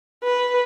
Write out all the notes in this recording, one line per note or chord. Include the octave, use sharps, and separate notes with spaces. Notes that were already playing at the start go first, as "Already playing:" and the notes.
B4